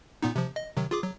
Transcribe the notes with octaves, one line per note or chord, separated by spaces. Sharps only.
A#2 B3 D#4
C3 F3
D#5
C3 D#3 F#3
F4 G#4 D6
F#3